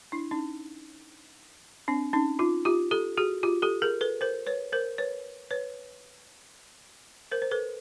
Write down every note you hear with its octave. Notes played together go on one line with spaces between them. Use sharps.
D4 E4
C#4 D#4
C4 D4
C#4 D#4
D#4 F4
F4 G4
G4 A4
F#4 G#4
F4 G4
G4 A4
G#4 A#4
A4 B4
A#4 C5
B4 C#5
A#4 C5
B4 C#5
B4 C#5
A#4 C5
C5
A4 B4